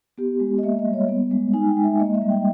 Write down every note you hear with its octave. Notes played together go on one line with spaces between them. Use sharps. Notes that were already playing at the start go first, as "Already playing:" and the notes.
B3 G4
G#3
D#5
A#3 E5
D#5
G3
C#5
B3
G#3
D#4 G#5
G5
G#3
E5
A#3 D#5
E5
G3
G5